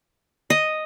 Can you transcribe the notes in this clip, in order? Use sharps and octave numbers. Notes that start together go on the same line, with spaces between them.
D#5